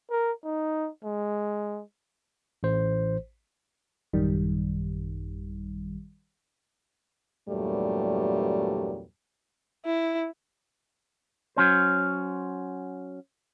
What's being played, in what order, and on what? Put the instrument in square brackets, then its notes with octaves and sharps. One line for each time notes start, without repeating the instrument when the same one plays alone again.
[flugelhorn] A#4
D#4
G#3
[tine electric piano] A1 C5
[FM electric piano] A1 F#2 D#3 G3
[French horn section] E2 G2 A#2 F#3 G3 A3
[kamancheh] E4
[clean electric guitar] F#3 C#4 C5